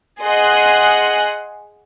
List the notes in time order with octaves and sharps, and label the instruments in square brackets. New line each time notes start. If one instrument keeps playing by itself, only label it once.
[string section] G#4 D#5 F#5 C6 D#6 F#6